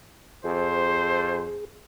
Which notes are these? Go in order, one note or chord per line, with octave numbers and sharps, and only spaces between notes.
F2 G#4 C5